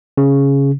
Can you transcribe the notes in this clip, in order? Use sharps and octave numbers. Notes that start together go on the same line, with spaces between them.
C#3